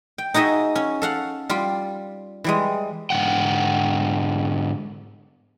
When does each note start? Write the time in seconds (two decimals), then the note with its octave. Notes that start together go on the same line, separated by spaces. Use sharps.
0.18 G5
0.34 D#4 F#4 G#4 D#5 E5
0.75 C#4
1.02 A4 F5 F#5
1.49 G3 F4
2.44 E3 G3 G#3
3.10 G#2 D3 G3 F#5 G5